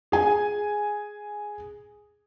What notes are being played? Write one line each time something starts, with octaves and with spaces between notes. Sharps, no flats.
G#4 G#5